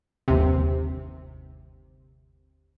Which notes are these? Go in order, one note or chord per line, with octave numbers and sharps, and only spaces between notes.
G1 D#2 C3